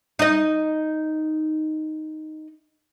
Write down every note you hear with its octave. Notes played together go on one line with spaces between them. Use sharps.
D#4 D#5